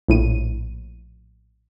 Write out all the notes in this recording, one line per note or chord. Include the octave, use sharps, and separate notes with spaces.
A#1 A2 D#7